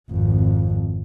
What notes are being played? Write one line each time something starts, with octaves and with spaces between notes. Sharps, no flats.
G#1 F2